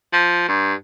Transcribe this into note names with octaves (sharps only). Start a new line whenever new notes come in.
F3
G2